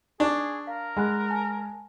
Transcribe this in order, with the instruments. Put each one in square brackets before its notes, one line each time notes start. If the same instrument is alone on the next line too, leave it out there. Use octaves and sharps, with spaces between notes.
[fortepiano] D4 [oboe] G#4 [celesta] C#6 D6
[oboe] A#4 [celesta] F5
[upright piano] G#3 [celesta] F#5 B5 F#6
[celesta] G#5 A5